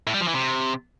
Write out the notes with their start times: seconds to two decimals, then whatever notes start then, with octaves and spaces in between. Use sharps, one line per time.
0.07 A2
0.14 G3
0.21 F3
0.28 E3
0.34 C3